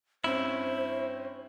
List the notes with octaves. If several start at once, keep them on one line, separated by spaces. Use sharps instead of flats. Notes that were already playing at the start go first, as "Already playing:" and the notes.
G2 C4 C#4 E4 C5